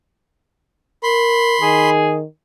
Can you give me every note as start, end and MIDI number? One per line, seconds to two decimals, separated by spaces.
1.03 1.56 70
1.03 1.90 83
1.03 1.90 84
1.61 2.24 51
1.61 2.17 68